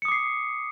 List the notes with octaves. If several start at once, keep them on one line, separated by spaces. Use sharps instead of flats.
D6 D#6 C7 C#7